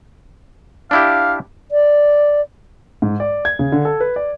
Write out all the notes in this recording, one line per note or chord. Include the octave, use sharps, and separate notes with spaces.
D4 E4 G4 F5
D5
G#2
D5
G#6
C#3
D3
A4
B4
D5